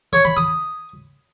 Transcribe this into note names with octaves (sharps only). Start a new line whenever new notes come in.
C#5
B5
D#6